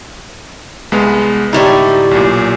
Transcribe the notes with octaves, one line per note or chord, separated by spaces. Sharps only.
C2 G#3 B3
D2 A2 G3 D#4 E4
B1 A#2